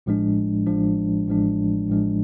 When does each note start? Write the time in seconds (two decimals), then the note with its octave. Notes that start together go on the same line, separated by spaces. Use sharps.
0.06 A1 A2 F3 G#3 D4
0.67 A1 A2 F3 G#3 D4
1.28 A1 A2 F3 G#3 D4
1.88 A1 A2 F3 G#3 D4